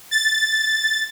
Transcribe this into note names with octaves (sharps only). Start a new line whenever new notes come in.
A6